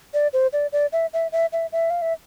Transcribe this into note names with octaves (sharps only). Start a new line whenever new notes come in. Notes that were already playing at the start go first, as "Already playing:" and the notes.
D5
C5
D5
D5
E5
E5
E5
E5
E5
F5
E5